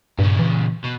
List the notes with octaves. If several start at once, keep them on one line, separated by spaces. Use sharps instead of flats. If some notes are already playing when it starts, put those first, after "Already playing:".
G2 A#2 C#3
E3
B2